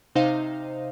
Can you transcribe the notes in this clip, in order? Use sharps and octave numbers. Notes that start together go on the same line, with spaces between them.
C3 D#4 C5 D#5 F5